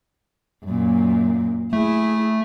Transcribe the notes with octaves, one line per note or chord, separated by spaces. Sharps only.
F#2 A#2
A3 E4 G#4